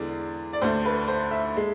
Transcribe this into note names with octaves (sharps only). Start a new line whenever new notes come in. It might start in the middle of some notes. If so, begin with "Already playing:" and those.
Already playing: E2 D3 G#3 D5
D5
D2 D3 A3 C5
B4
C5
E5
G#3